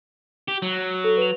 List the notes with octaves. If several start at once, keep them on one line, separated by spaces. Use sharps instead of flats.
G4
F#3
A4
B4 F7